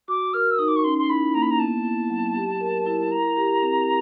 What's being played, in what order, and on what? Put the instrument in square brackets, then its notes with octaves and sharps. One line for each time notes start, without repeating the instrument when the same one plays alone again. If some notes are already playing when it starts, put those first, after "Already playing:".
[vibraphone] F#4 [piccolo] D6
[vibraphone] A#4 [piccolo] F6
[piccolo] E6
[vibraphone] D#4 [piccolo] D#6
[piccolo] D6
C#6
[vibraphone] C#4 [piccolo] C6
[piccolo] C6
[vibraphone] E4 [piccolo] B5
[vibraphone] A#3 [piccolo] A#5
[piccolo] B5
A#5
[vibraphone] B3 [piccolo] A5
[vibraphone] E4
F#3
G4
A#4
E4
[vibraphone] E4 [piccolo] A#5
[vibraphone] G4
C4